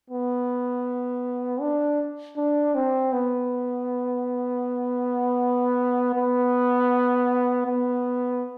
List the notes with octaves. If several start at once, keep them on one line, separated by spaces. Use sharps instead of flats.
B3
D4
D4
C4
B3
B3
B3